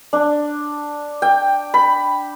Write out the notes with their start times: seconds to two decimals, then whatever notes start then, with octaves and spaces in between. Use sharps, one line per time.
0.13 D4
1.22 G5
1.74 B5